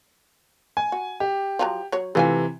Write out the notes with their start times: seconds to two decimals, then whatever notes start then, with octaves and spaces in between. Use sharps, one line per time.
0.77 G#5
0.92 F#4
1.20 G4
1.59 F3 F#3 A#5
1.92 F#3 C#5
2.15 C3 E3 A3 F4 G#5